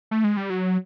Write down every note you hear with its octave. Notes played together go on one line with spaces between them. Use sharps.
A3
G#3
G3
F#3